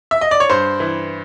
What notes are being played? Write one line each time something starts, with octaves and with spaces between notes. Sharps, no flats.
E5
D#5
D5
C#5
G2 C5
E3